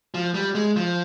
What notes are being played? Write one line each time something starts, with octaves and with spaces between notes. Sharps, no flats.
F3
G3
G#3
F3